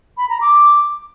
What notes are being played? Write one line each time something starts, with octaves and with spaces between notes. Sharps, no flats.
B5
A#5
D6